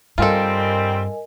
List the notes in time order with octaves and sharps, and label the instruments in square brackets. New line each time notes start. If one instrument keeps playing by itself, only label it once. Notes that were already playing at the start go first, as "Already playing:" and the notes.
[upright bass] G2 [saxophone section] G3 C4 [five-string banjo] F4 A4 [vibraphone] A#4 D#5 G#5